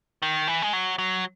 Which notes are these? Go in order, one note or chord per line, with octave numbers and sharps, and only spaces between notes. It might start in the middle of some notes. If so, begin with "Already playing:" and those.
D#3
E3
G#3
F#3
F#3